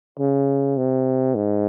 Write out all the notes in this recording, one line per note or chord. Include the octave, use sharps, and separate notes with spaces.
C#3
C3
G#2